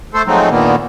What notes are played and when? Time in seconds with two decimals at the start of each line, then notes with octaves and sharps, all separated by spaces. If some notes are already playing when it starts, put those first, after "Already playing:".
0.14 A3 A4 C5
0.27 F3 F#3 G#3 A3 C4 D#4
0.50 A#2 D3 D#3 A#3 B3